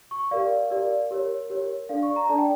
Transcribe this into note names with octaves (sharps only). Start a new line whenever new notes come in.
C#6
G4 A#4 D5 F5
G4 A#4 D5
G4 A#4 C#5
G4 A#4 C#5
D4 A4 D5 F5
C#6
A#5
D4 A4 D5 A5
G5